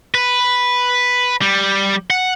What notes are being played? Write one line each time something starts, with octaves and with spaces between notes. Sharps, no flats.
B4
G3
F#5